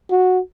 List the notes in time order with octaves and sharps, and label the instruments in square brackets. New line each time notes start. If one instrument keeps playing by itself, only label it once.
[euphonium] F#4